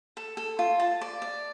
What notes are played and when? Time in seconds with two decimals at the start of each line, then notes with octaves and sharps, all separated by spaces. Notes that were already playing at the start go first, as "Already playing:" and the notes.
0.17 A4
0.37 A4
0.59 F4
0.80 A5
1.01 D5
1.22 D5